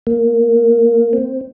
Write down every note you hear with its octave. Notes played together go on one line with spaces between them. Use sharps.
A#3
C4